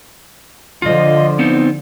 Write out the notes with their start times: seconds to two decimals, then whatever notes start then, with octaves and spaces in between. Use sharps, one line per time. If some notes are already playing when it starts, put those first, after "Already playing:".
0.82 D3 F3 F4 D#5
1.39 B3 C4 D#4